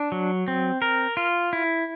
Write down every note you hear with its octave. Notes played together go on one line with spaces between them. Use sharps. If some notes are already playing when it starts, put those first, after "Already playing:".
Already playing: D4
F#3
C4
A#4
F4
E4